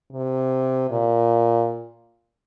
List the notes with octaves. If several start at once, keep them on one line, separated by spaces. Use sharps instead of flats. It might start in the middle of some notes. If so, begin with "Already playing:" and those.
C3
A#2